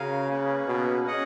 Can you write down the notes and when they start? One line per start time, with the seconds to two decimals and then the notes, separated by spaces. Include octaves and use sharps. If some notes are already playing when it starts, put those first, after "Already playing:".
Already playing: C#3 C#4 F#4 A#4 F5 G#5
0.29 A#3 C#4 G#4 B4
0.68 B2
1.07 C#4 G#4 D#5 F#5